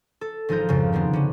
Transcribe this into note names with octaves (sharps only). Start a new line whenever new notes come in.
A4
G#1 F3 D#4 A#4 G6
F2 G#2 C#3
D3 D#3 B3 C4
D3 C#4